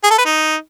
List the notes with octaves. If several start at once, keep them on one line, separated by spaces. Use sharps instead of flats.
G#4
A4
B4
D#4